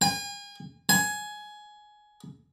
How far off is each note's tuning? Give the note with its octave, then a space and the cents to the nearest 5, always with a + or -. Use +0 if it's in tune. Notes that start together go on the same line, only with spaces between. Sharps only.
G#5 -35
G#5 +15